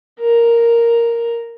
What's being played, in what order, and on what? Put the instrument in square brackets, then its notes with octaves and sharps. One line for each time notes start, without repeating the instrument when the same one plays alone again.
[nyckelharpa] A#4